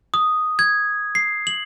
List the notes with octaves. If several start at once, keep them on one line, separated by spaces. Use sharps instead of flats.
D#6
G#6
C7
F#7